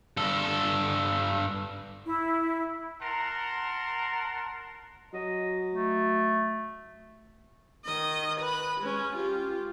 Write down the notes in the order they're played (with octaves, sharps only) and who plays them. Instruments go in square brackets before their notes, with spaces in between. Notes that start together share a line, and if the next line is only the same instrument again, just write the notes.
[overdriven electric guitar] G2 A4
[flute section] E4
[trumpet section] A#4 F#5 A5 A#5 C6
[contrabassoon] F#3 [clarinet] D#5
[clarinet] A3
[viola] D#3 D#5
B4 B5
G#3 C#4
F4 G4